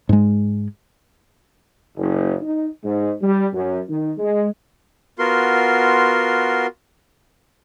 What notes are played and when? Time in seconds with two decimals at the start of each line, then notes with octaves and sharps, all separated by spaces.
0.09 G#2 G#3
1.97 F#1
2.40 D#4
2.84 G#2
3.21 G3
3.52 F#2
3.88 D#3
4.18 G#3
5.19 B3 F4 F#4 A#4 C6